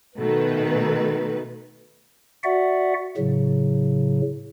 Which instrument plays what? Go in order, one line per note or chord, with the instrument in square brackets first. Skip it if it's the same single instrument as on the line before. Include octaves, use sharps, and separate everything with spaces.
[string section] B2 D#3 A3 B4
[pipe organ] F#4 D5 E5 F#5
A2 C#3 F#3